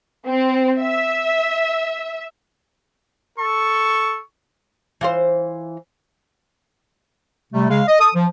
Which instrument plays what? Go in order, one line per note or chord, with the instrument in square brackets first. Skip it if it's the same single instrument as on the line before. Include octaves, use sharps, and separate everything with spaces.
[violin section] C4
E5
[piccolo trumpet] A4 [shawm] C#6
[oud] E3 F4 C5
[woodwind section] C3 G3 A3
C#3 G#3 F5
D#5
A4 D#6
F3